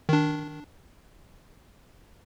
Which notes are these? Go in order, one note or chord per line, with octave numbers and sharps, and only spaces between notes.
D#3 D4